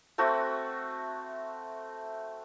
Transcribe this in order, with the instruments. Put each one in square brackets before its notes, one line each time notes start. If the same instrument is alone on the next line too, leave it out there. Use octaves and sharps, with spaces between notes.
[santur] A3 C4 F#4 E5